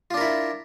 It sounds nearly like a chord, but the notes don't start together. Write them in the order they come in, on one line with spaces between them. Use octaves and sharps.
F4 D4 A#4 E4